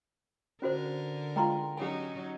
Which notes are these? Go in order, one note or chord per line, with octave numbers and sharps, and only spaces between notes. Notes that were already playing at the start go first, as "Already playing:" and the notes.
D3 C#4 F#4 A#4 C5
G#3 F4 G5 A#5 C6
F#3 C#4 D#4 G4 G#5